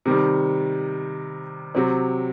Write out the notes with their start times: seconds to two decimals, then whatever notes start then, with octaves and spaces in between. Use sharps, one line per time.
0.05 C3 D#3 G3
1.75 C3 F#3 C4